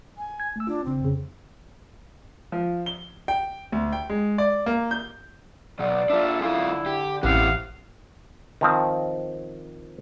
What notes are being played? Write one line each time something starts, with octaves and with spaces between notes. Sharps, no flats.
G#5
G#6
A3 E6
D4 F4
G#1 C#3 C4
F2 C#3
F3
G7
G5
D2
G5
G#3
D5
A#3
G6
B2 F#3 D5
D4 F4 A4 E5
F#2 D3 E4 F4 G#4 F5
G4
A1 F#2 E3 C4 E4 G4 F5 F#5
D#3 F3 C4